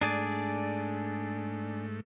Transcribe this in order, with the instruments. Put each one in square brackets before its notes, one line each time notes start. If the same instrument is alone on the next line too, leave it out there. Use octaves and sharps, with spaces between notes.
[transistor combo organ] G#2 A3 [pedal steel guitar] D4 G#4 D5